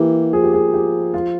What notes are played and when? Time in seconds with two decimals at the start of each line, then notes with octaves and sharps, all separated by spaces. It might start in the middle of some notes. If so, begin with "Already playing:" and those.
Already playing: E3 A#3 G4
0.33 F3 G#4
0.44 G4
0.53 G#4
0.74 G4
1.14 F4